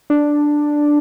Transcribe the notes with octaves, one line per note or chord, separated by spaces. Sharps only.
D4